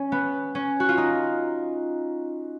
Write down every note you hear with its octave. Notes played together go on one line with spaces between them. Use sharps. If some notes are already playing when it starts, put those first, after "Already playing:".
Already playing: C#4
B3
C#4
F#4
F4
D#4